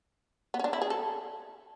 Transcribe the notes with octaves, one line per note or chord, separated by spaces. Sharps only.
B3
C#4
D4
E4
G#4
A4